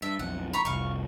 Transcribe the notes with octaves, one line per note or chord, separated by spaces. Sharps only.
G2 E5
B1 F2 F#5
A#5 B5 C#6
F1 C2 F5 C#6